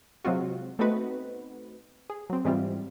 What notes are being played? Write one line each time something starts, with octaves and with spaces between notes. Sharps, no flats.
C3 F#3 G#3 C4 F4 F#4
A3 B3 C4 D#4 F#4 B4
G#4
F#3 C4
G#2 E3 G3 C4 F4